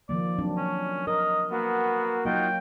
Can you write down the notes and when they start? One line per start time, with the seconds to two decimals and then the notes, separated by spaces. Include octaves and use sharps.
0.09 D#3 F3 A#3 D5
0.39 F#3 C4 D4
0.57 C#4
1.07 A#4 D#5
1.51 A#3 B3 F#4
2.25 F#3 A#3 D#4 F4 F#4 G5